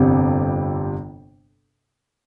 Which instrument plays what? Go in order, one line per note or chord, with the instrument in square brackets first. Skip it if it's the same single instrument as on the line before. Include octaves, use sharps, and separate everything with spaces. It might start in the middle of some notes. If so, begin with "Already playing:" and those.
Already playing: [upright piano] G1 F2 C3 G3 C4